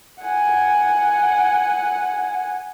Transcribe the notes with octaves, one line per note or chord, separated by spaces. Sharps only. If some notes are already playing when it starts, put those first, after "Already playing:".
F#5 G#5